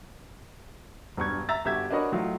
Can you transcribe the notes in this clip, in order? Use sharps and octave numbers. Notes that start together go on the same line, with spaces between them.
E1 G2 C#6 G#6
E5 A#5 E6 A6
G1 F#4 G4 E5 G#6
D4 F#4 A#4 B4 C#5 D#5
A2 F#3 D#4 F4